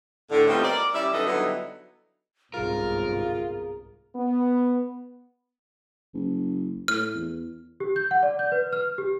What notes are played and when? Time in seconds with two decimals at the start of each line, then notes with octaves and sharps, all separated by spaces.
0.31 A2 D3
0.47 G3 A3 B3 C4 D#4 F4
0.64 A#4 D5
0.93 G3 C#4 E4 D5 E5
1.12 F#2 D#3 A4 B4 D#5
1.27 D3 F#3 G3 B3 D#4 E4
2.54 G1 C2 G#2 F4 G#4 A#4
4.15 B3
6.14 F#1
6.88 A2 F6
7.15 E2
7.80 G4
7.96 G6
8.11 F#5
8.23 D5
8.39 G6
8.52 B4
8.73 F6
8.98 G4